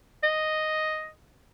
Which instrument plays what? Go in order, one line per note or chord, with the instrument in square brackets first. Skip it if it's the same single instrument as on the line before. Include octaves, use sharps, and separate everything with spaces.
[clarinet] D#5